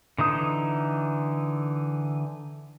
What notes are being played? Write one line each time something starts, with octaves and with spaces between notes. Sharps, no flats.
D3 E3 D#4 D#6